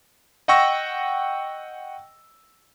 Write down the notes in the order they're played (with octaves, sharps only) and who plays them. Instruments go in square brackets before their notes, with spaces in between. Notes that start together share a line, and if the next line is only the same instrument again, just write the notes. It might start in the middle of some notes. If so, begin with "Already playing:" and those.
[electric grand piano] D#5 F#5 G5 C#6 E6 A#6